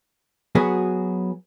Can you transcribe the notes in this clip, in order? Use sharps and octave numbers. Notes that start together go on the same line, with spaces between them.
F#3 B3 F#4 G#4